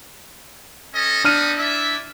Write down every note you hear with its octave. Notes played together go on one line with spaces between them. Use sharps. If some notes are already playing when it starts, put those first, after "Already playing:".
C#4 A4 D#5
B3 C4 D4 D#4 F6 D#7
E4 D5 E5